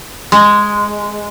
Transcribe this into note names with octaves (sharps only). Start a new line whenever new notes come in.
G#3